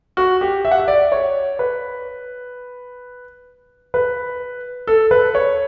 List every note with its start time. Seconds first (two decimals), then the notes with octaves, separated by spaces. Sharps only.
0.17 F#4
0.41 G4
0.65 E5
0.71 F#5
0.80 E5
0.88 D5
1.12 C#5
1.59 B4
3.94 B4
4.87 A4
5.11 B4
5.35 C#5